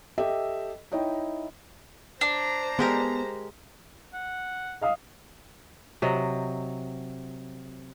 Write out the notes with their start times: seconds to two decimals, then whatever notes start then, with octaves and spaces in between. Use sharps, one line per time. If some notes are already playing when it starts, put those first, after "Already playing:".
0.18 G4 A4 D#5 E5
0.92 D#4 E4 C#5 D#5 G5
2.21 D4 C5 A#5
2.79 G#3 B3 G4 A#4
4.13 F#5
4.81 D#5 F5 D#6
6.02 C3 F#3 D#5